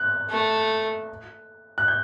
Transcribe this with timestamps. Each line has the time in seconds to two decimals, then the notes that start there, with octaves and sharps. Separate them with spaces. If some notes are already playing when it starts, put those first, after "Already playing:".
Already playing: F#6
0.30 A3
1.78 F#6
1.88 G6